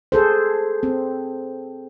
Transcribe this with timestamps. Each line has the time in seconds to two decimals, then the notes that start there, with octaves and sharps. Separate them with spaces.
0.12 G#4 A4 C5
0.83 C4